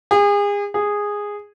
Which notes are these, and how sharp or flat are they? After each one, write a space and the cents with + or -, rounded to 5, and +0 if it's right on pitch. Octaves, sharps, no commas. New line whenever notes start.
G#4 -35
G#4 -10